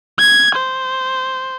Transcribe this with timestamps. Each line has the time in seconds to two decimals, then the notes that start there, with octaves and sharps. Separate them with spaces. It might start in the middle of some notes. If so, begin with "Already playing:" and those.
0.19 G#6
0.55 C5